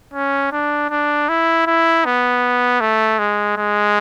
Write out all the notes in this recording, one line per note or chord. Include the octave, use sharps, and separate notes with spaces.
C#4
D4
D4
E4
E4
B3
A3
G#3
G#3